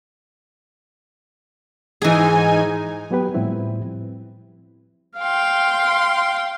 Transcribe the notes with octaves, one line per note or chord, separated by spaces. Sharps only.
G#2 E3 D#4 G#4 G#5
F#3 B3 G4 B4
A2 F3 G3 C4 E4
F5 G5 C6